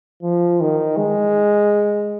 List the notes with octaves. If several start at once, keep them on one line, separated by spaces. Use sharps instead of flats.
F3
D#3
G#3